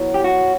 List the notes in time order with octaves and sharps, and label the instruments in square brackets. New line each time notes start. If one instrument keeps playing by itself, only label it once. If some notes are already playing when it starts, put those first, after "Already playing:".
Already playing: [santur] F#3 B3 E4
[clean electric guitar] G4
F#4